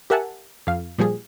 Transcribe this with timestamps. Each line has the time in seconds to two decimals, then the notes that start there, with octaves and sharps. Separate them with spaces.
0.10 G4 A#4 E5 F#5 G#5 A5
0.67 F2 F5
0.98 A#2 F3 G3 G#4